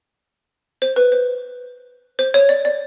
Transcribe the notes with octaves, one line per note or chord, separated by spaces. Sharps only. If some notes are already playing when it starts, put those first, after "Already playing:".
C5
B4
C5
C5
C#5
D5
D5